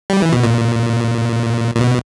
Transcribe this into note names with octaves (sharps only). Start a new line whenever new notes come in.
G3
E3
B2
A#2
A#2
B2